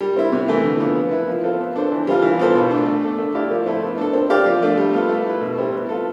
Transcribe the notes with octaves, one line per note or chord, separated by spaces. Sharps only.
G3
C4 E4
C3
E3 A3
D3
F3 B3
B3
E4 B4
F3
C4 F4 A4
B3
D4 A4 C5
E3
G3 C4 F4
E3
B3 F4 A4 C5
B2
A3 D4
A3
D4 A4
A3
E4 G4 D5 F5
F3
A3 C4 E4 A4
B3
D4 A4
C4
G4 D5 F5
F3
A3 D4
G3
B3 F4 A4
A3
E4 B4
B2
G3 C4 E4
B3
F4 A4